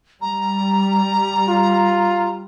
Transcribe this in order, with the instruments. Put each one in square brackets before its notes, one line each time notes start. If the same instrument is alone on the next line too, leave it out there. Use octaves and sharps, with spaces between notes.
[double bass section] G3 [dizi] A#5
[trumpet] F4